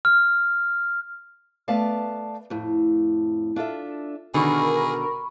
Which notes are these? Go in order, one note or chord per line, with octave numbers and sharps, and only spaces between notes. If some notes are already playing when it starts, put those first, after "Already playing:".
F6
A3 B3 B4 D5 F5 A5
F2 A2
D4 F4 A4 E5
B2 D3 D#3 G#4 A#4 B5 C#6